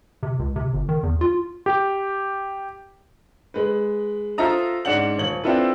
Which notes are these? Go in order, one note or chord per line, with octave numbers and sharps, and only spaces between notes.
C3
C#2
C3
G1
D#3
E2
F4
G4
G#3 B4
F4 A4 C5 E5 A#5 D#6
G#2 C#4 D4 F#5 F#7
D#1 C#5 F#7
C4 D4 E4 F4 A4 B4